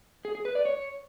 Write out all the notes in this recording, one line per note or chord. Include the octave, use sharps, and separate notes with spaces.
G#4
G#4
B4
D5
C#5